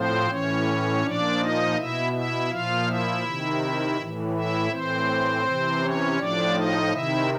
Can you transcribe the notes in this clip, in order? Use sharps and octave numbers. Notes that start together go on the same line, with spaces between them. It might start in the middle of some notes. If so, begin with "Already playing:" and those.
Already playing: A2 F3 C4 C5
A2 E3 C#4 C#5
A#2 F3 D4 D5
D#4 D#5
B2 E4 E5
E4 E5
A#2 F3 F4 F5
E4 E5
C3 D#3
A2 E3
E4 E5
A2 E3 C4 C5
C3 E3
C#4 C#5
A2 F3 D4 D5
D#4 D#5
C3 D#3 E4 E5